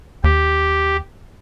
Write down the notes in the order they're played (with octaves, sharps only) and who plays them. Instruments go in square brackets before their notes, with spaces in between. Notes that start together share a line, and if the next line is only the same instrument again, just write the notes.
[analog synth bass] D#2 [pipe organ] G4